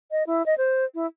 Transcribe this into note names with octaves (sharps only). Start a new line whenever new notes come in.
D#5
E4
D#5
C5
E4